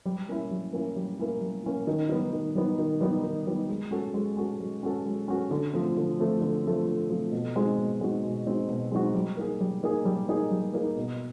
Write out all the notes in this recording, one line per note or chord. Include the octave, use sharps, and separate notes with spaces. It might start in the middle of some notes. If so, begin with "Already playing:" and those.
G3
A#3 C#4 E4
G3
A#3 C#4 E4
G3
A#3 C#4 E4
G3
A#3 C#4 E4
D#3
G3 B3 D#4
D#3
G3 B3 D#4
D#3
G3 B3 D#4
D#3
G3 B3 D#4
G#3
C#4 F#4 A4
G#3
C#4 F#4 A4
G#3
C#4 F#4 A4
G#3
C#4 F#4 A4
D3
F3 A3 C4
D3
F3 A3 C4
D3
F3 A3 C4
D3
F3 A3 C4
B2
G#3 C4 D#4 F#4
B2
G#3 C4 D#4 F#4
B2
G#3 C4 D#4 F#4
B2
G#3 C4 D#4 F#4
G3
A#3 D#4 G#4
G3
A#3 D#4 G#4
G3
A#3 D#4 G#4
G3
A#3 D#4 G#4
B2